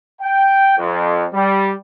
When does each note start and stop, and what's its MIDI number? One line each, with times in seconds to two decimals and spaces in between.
0.22 0.75 79
0.78 1.25 41
1.33 1.72 55